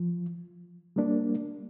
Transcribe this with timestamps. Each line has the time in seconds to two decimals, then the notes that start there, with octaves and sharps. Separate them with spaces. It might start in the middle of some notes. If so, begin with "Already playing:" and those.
Already playing: F3
0.96 G3 A#3 D4